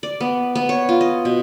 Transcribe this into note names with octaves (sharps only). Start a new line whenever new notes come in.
D5
B3
B3
C#5
F4
D#5
B2